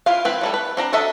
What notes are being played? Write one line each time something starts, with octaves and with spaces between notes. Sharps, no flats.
E4 F4 F5
E3 C4 B4
F#3 G3 A4
B4
C4 D4 A#5
D4 F#4 A4 D#5 E5